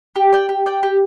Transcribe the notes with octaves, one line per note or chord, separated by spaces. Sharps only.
G4
D5 G5
G4
D5 G5
G4